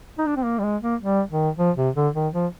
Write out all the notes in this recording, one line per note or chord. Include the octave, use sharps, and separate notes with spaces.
D#4
D4
C4
A#3
G3
G#3
A#3
G3
D#3
F3
C3
D3
D#3
F3